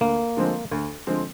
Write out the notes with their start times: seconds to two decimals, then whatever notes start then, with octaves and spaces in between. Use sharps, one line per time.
0.01 D2 A#3
0.37 D3 F3 G#3 C4
0.71 D2
1.07 D3 F3 G#3 C4